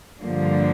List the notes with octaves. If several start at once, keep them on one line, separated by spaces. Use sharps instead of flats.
G2 D3 F3 A#3